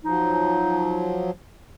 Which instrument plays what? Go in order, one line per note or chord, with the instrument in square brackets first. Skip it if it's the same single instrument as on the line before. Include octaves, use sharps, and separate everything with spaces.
[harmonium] F3 F#3 [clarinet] D#4